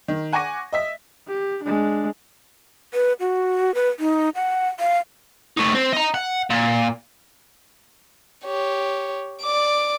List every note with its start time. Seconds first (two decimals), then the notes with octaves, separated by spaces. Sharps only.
0.08 D#3
0.33 F#5 G#5 C#6 D6 A#6 D#7
0.73 D#5 E5 B6
1.28 G4
1.63 G#3 D4
2.94 B4
3.20 F#4
3.75 B4
3.99 D#4
4.35 F#5
4.80 F5
5.57 A3 D#4
5.75 C4
5.93 D#5 A#5
6.14 F#5
6.50 A#2
8.45 G4 C#5
9.42 D5 D6